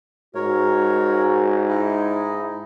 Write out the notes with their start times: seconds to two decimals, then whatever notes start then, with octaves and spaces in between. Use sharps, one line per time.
0.35 G#2 F#4 A#4 C#5
1.68 D#4 E4 D#5